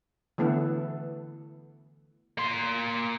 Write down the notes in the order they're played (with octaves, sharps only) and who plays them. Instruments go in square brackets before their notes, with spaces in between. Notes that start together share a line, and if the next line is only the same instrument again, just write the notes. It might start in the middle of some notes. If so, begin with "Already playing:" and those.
[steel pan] D3 E3 A3 B3 A4
[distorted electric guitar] A#3 C6